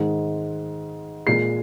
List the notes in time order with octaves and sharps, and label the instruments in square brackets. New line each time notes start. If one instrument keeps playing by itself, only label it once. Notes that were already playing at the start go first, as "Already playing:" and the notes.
Already playing: [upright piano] G#2 D#3 G#3
A#2 G#3 C7